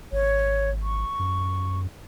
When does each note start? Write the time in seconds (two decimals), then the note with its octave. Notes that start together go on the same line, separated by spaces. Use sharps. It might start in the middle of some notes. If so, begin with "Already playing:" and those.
0.12 G#1 C#5
0.82 C#6
1.19 F#2